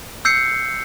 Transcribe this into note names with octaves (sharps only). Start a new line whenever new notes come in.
E6 G6 C7 C#7